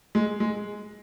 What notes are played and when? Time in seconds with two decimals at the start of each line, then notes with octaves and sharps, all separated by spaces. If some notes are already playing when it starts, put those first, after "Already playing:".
0.15 G#3
0.40 G#3